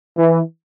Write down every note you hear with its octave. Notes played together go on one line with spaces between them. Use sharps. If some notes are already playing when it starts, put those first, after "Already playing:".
E3